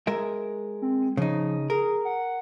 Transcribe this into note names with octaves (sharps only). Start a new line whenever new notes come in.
G#3 A#4 E5
C4
C#3 F3 D#4
G#4 A#4
F#5